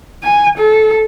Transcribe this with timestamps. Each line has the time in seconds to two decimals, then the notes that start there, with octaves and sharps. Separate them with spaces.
0.23 G#5
0.58 A4